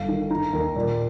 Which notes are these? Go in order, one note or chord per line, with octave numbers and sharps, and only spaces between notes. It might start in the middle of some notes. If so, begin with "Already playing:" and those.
Already playing: G1 F5
D#3
D#3 A#5
D#2
A#2 D5